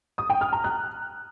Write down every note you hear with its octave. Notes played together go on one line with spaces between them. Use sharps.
D#6
G5
F6
A#5
F#6